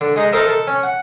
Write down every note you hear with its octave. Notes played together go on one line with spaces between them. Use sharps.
D3
G#3 D#4 A#5
D#4 A4 A#4 C5 D#5 E5
A4
C#4
F#5